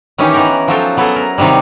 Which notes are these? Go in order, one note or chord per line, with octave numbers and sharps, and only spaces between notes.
D#3 E3 C#4 D#4 G4
E3 B3 A#4
F3 F#3 D#4 F#4 A4 G5
F#3 B3 E4 G#4 A4
A#4
C3 D#3 F#3 G3